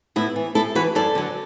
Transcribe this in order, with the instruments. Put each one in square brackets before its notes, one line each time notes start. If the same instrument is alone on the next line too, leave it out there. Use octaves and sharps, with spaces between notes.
[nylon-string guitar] A2 B3 E4
E3
A2 E4 A4
E3 F#4 B4
F#2 A4 D5
D3 F#3